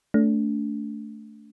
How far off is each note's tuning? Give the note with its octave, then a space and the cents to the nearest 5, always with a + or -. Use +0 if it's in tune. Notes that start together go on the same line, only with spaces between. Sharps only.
A3 +0 D4 -30